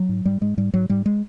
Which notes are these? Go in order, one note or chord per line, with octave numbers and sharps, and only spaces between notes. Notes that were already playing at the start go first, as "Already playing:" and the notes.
Already playing: F#3
G#2
G#2 G3
G#2 G#3
G#2 G3
G#2 F#3
G#2 G3
G#3